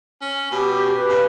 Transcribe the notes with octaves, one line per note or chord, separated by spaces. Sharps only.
C#4
B2 G4
B4
C#3